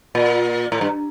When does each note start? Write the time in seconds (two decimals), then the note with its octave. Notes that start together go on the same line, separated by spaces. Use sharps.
0.15 A#2
0.72 A2
0.81 G2